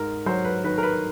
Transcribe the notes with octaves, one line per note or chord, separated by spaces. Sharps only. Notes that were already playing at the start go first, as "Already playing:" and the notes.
Already playing: G#2 A#4
F#3 C5
B4
D#3 B4
A#4
B4